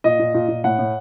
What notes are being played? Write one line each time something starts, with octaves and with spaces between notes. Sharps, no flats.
A#2 D#5
A#2
A#2
A#2
A2 F#5
A2